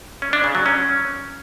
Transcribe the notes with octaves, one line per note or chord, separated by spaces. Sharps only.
C#4
D4
C#3
F#3
C#4